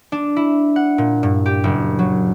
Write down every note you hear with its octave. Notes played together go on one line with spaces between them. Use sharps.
D4
E4
F#5
A#2
G2
G4
F#1
F#3